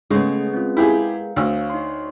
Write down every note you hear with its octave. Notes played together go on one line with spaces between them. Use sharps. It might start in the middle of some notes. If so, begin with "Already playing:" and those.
C#3 G#3 A3 B3 C#4 A4
C4 C#4 F4
E4 G4 G#4 A#4 F5 G5
D2 C#5 F5 E6
D#4 C#5 C6